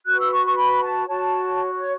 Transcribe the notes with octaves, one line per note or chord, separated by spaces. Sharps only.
F#4 B4 F#6
E6
C#6
C#6
B5
A5
F#4 C#5 A5
C#5